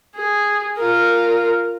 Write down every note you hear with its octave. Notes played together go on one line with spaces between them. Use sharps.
G#4
F4 A#4